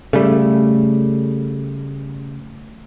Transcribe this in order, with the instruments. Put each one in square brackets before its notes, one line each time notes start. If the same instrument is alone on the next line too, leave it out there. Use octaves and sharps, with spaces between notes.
[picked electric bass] C#3 G3 [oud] A3